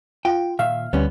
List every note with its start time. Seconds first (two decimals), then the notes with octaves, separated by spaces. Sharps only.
0.25 F4 G5
0.59 A#2 D#3 E5 F5
0.93 D2 G3 B3 C#4